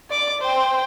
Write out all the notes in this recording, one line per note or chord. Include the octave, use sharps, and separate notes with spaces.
D5 D6
C5 G5